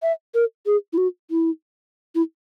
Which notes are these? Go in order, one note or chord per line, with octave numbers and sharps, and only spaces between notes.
E5
A#4
G#4
E4
F#4
E4
E4